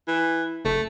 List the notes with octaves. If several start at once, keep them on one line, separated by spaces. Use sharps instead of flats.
E3
F#1 A3